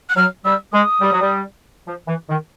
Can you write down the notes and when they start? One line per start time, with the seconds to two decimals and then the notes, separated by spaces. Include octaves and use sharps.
0.10 F#6
0.16 F#3 F6
0.45 G3 E6
0.73 G#3 D#6
1.01 G3
1.12 F#3
1.21 G3
1.87 F3
2.07 E3
2.29 D#3